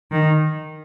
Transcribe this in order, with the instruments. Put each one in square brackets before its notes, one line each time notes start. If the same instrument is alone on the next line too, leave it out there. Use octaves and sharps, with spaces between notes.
[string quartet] D#3